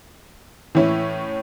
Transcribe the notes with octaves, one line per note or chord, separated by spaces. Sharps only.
A2 E3 C#4 E4